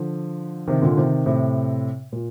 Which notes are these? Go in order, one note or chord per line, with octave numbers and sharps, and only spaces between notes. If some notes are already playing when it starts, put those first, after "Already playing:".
Already playing: D3 F3
C3 D#3
A#2 D3
C3 D#3
A2 C3
A#2